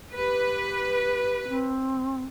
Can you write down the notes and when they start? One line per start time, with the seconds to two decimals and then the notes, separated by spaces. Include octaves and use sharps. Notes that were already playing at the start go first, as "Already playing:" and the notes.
0.15 G4 B4
1.48 C4